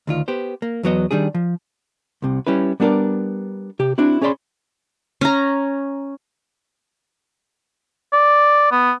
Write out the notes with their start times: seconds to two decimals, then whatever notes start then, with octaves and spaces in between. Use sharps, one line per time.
0.07 D2 D#3 F4
0.28 B3 G4 C5
0.62 A#3
0.83 E2 F#3 B3 D#5
1.11 D#3 G3 D4 G#4
1.35 F3
2.22 C2 C3
2.47 G3 C#4 E4 B4
2.80 G3 B3 D4 A4 A#4 D5
3.79 C3 G4
3.98 C4 D4 E4 F#4
4.21 C#4 G#4 C#5 D5 B5 C6
5.21 C#4 A#5
8.13 D5
8.72 B3